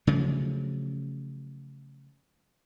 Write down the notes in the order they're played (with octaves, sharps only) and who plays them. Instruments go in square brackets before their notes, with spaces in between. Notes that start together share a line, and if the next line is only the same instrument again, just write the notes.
[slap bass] C#3 F3 F#3 A3